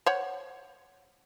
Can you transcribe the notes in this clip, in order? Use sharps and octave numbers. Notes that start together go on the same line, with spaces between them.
C5 C#5 F#5